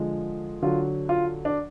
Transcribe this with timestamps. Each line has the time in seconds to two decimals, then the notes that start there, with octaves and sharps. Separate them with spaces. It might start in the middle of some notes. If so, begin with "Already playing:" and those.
Already playing: D3 F3 G#3
0.62 D3 F#3 F4
1.09 F4
1.45 D4